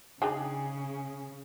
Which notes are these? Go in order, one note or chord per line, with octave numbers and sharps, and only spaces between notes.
C#3 D4 D#4 G#4 G5